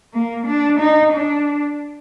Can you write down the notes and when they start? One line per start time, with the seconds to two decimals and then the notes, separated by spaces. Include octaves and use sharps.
0.14 A#3
0.47 D4
0.80 D#4
1.12 D4